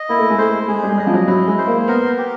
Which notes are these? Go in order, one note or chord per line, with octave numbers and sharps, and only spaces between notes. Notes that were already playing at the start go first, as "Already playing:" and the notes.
Already playing: D#5
A#3 E4
A3
G#3
A3 C5
G#3 G#4
G3
G#3
G3 D#5
F3
F#3
F#3 E4
G#3
C5
A#3
B3 A#4
G4